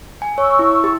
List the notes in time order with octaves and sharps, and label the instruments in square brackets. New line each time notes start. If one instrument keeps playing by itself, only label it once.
[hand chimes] G#5
[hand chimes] C#5 [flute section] C#6 E6
[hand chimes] E4
G4